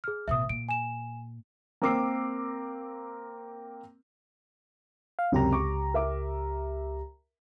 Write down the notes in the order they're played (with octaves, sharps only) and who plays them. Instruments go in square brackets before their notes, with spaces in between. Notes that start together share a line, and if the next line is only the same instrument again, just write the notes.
[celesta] G#4 F6
[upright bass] A1 B2 [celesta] E5 D#6
[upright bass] A#2 [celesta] D7
[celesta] G#5 E7
[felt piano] A#3 C4 A#4 D6 E6 C7
[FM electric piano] F5
[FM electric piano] C#2 G4 A#5 [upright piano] F#2 C3
[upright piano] C#6 D6
A#4 E5 D6